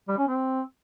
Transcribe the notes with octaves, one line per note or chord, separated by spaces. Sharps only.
G3
C#4
C4